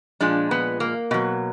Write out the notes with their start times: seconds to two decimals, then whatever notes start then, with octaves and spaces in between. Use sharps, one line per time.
0.20 A#2 F3 G#3 D4
0.51 B3
0.80 A#3
1.11 B2 F#3